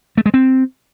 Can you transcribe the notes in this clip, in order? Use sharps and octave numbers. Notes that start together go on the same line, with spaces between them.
A3
G#3
C4